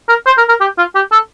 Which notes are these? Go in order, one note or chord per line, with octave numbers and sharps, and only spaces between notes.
A#4
C5
A#4
A#4
G4
F4
G4
A4